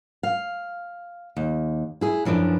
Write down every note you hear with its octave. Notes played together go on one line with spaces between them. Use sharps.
F5
D#2
E4 G#4
F#2 E3 F3 D4